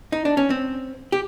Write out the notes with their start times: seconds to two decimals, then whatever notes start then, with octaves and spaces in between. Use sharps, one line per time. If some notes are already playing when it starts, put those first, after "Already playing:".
0.12 D#4
0.25 D4
0.37 C#4
0.50 C4
1.12 G4